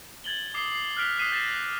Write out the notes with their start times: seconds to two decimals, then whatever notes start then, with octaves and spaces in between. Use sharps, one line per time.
0.24 G#6 A6 F#7 G7
0.54 D6 D#6 C7 F7 G7
0.72 C7
0.97 F6 F#6 B6 D7 F7
1.18 D#6 F#6 B6 C7 D#7 E7
1.32 G6 A6 A#6 C7 E7